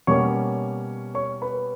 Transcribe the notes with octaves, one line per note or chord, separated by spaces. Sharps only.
B2 G3 A#3 C#4 C#5 C#6
C#5 C#6
B4 B5